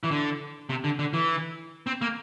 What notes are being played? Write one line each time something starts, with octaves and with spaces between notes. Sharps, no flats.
E3
D3
C3
D3
D3
E3
C4
A#3